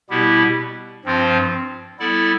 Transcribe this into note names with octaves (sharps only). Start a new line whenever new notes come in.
B2 G3 B3 E4 G4
G2 F3 C4 F4 C5
G3 B3 E4 A4 D5